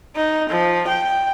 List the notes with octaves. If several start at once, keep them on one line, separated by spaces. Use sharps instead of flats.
D#4
F3
G5